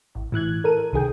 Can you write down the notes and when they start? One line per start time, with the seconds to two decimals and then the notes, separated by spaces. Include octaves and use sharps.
0.15 A1
0.32 A2 E3 F#6 G#6
0.64 A4 A#4 D#7
0.93 C2 D#3 G#4 G5